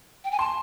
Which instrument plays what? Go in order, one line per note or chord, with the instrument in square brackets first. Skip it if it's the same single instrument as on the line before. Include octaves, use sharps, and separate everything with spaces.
[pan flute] G5
G#5
[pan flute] A5 [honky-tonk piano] C6